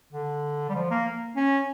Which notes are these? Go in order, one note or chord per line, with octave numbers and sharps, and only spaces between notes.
D3
G3
F3
A#3
C#4